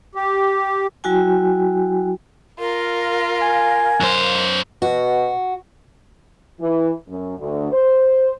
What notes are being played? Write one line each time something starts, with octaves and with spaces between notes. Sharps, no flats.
G4
F#3 E4 F#4 G5 G#5
F4 A#4 F5
G#5
F#2 C5
B2 F#4
E3
F#2
D2
C5